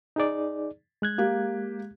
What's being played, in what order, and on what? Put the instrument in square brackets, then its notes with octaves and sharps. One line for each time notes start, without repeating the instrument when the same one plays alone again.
[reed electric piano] D#4 G#4 D5
G#3 F#6 G#6
[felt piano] A#3 G4